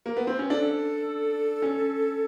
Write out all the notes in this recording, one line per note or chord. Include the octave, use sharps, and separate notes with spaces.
A#3
B3
C4
C#4
D4 A4
C#4